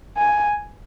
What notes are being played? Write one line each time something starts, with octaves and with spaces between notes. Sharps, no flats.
G#5